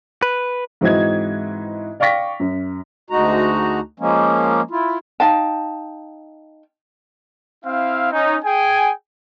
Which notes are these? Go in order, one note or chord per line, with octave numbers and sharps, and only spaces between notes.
B4
G#2 E3 C4 F#4 D#5 G#6
D5 F5 G5 C#6 A#6 B6
F#2
D2 G#3 D#4 F#4 A#5
F3 G#3 A#3 C#4
E4 F4
D#4 F5 G5 A5
C4 E4 F5
C#4 D#4
G#4 G5 G#5